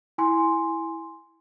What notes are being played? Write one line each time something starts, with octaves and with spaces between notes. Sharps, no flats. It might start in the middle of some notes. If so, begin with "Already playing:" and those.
E4 G#5 C6